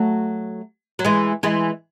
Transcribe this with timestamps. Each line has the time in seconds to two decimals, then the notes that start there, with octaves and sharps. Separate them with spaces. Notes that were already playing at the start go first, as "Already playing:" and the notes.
Already playing: F#3 A3
0.99 F#3
1.05 E3 G#3
1.43 E3 G#3